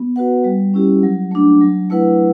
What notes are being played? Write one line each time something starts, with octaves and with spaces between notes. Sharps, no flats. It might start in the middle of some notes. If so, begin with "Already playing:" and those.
Already playing: B3
F#4 B4 F#5
G3
C#4 E4 G4
F#3
A3 D4
F#3
A3 E4 B4 F#5